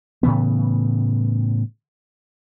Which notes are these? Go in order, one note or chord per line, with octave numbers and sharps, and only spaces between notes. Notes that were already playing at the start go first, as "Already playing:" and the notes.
A2 C#3 E3 B3